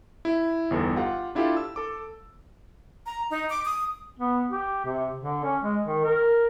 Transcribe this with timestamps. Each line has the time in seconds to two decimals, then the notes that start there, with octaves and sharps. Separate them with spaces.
0.25 E4
0.70 G1 E2 D#4 A4
0.96 F4 G4 F#5
1.35 D4 E4 F4 G4 A4
1.57 E6
1.76 A4 D6
3.06 A#5
3.30 D#4
3.50 D6
3.66 D#6
4.19 B3
4.50 G4
4.85 C3
5.20 D3
5.44 C#4
5.63 G#3
5.85 D#3
6.04 A#4